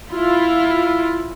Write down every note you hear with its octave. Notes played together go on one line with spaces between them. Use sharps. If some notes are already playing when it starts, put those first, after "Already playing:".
E4 F4